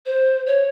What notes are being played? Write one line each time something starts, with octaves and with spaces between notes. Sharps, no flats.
C5
C#5